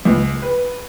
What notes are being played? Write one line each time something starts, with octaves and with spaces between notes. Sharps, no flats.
C#2
B4